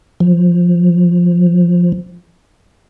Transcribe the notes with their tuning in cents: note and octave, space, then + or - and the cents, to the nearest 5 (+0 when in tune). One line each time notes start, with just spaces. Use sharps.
F3 +5